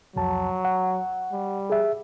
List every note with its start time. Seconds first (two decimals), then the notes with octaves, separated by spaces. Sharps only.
0.16 C2 F2 F#3 A5
0.65 F#5
1.32 G3
1.70 G#4 E5